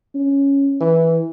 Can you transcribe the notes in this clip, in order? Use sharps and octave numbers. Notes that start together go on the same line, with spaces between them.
C#4
E3